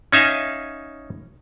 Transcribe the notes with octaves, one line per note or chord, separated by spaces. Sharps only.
C#4 D#4 E5 F5 G#5